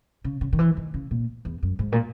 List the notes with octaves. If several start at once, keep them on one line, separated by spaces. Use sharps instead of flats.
C#3
C#3
D#3
E3
D#3
C#3
A#2
E2
F#2
G#2
A#2